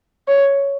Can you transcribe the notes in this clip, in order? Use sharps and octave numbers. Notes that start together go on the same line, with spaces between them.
C#5